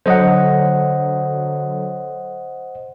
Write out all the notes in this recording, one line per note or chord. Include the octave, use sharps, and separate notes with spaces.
D3 F#3 C5 D#5 F#5